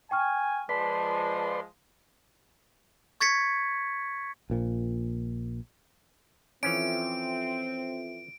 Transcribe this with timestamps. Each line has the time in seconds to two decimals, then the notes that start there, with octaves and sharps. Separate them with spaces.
0.11 G5 G#5 C#6 F6
0.69 F3 G#3 B4 D5 A5 C6 B6
3.21 C#6 G#6 A6 B6 C#7
4.50 A#1 A#2 F3
6.63 E3 F3 C4 C#4 F4 A4 E5 D7